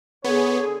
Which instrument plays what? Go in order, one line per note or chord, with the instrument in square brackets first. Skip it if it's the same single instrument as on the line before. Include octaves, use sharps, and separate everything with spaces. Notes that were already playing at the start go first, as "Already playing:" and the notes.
[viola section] D3 G#4 [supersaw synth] B3 [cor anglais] C#5